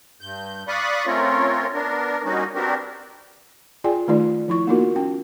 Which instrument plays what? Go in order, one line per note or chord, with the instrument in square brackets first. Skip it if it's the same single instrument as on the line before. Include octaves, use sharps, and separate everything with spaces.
[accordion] G2 G6
D5 F5 B5 C#6 D#6 F#6
A3 C4 C#4 F4 A#4 C#5
B3 D4 A#4
G3 A#3 C#4 D#4 F#4
B3 C4 D4 F#4 G4 A#4
[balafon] F4 G#4 D5 G5 G#5
D#3 A3 D#4 F4 D5
F3 E4 C#6
A#3 B3 D#4 F4 F#4 A#4
C#4 G5